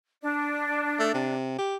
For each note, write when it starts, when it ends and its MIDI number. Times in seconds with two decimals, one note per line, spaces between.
0.23 1.34 62
0.99 1.13 57
1.14 1.56 48
1.58 1.76 67